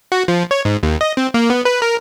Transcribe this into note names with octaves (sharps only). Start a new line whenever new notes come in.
F#4
F3
C#5
G#2
D#2
D#5
C4
A#3
B3
B4
A#4